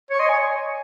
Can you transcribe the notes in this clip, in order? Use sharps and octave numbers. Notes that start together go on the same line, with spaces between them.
C#5 C#6
D#5 C6
C#5 G#5